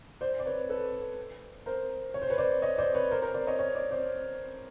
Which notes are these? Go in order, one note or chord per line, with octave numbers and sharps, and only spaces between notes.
C5 D5
D5
B4 C#5
A4 B4
A#4 C5
C#5
C5
B4 C#5
C5 D5
C#5 D#5
C5 D5
B4 C#5
A#4 C5
A#4 C5
C5 D5
C#5 D#5
C#5 D#5
C5 D5
C5 D5